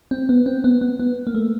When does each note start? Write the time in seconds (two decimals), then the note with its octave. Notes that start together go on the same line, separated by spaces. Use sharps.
0.11 C4
0.29 B3
0.46 C4
0.64 B3
0.81 B3
1.00 B3
1.27 A#3
1.35 A3